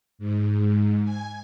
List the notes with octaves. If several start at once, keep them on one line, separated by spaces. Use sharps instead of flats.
G#2
G#5